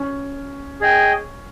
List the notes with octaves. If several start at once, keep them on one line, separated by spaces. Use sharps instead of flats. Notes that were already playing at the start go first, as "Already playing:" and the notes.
Already playing: C#4
G#4 D#5 G5